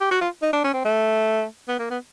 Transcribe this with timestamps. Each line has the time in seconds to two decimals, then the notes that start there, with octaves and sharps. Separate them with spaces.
0.01 G4
0.11 F#4
0.21 F4
0.42 D#4
0.53 D4
0.64 C#4
0.74 C4
0.85 A3
1.68 B3
1.79 A#3
1.90 B3